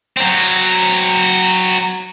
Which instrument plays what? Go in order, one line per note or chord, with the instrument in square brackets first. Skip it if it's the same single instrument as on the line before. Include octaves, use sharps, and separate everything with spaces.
[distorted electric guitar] F#3 C4